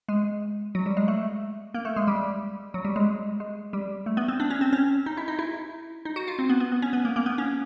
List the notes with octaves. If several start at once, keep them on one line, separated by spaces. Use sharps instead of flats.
G#3
F#3
G3
G#3
A3
A#3
A3
G#3
G3
F#3
G3
G#3
G#3
G3
A3
B3
C4
D4
C#4
C4
C#4
D#4
E4
D#4
E4
D#4
F#4
F4
C4
B3
B3
B3
C#4
B3
A#3
A#3
B3
C#4